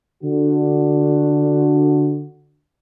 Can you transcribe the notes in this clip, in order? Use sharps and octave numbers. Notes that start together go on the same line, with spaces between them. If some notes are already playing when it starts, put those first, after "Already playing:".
D3 F#4